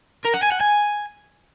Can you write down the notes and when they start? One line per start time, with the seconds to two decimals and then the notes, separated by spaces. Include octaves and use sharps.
0.25 A#4
0.34 F#5
0.43 G#5
0.52 F#5
0.61 G#5